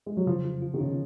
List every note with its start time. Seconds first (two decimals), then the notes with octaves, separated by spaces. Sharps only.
0.06 G#3
0.17 F#3
0.27 C#3 F3
0.45 F4
0.62 F4
0.74 D#3
0.80 C#3 F4